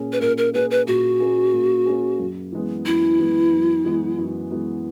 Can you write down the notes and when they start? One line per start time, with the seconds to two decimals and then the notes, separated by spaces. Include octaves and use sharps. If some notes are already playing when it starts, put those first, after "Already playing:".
Already playing: A#2 A#3 C#4 G#4
0.12 B4
0.20 A#2 A#4
0.38 A#4
0.53 A#3 C#4 G#4 B4
0.71 B4
0.87 A#2 F#4
1.20 A#3 C#4 G#4
1.53 A#2
1.86 A#3 C#4 G#4
2.19 F#2
2.52 E3 G#3 B3
2.86 F#2 E4
3.19 E3 G#3 B3
3.52 F#2
3.85 E3 G#3 B3
4.18 F#2
4.51 E3 G#3 B3